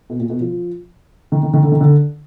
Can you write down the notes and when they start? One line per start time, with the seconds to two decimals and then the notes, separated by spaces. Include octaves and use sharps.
0.10 B2
0.20 A#2
0.30 B2
0.41 F3
1.32 D#3
1.43 D#3
1.53 D#3
1.63 D3
1.72 D#3
1.81 D3